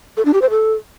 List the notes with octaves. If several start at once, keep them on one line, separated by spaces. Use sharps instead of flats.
A4
D4
G4
C5
A4